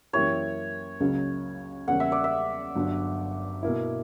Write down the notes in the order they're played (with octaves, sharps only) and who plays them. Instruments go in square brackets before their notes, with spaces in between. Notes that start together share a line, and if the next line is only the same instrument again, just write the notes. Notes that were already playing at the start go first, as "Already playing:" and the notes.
[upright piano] F#2 E3 A#3 E4 G4 [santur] C#5
[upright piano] C#2 C#3 F#3 A#3
[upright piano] E2 C#3 G3 A#3 C#4 [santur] F#5
[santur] E5
D5
E5
[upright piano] G1 G2 F#3
B2 A#3 E4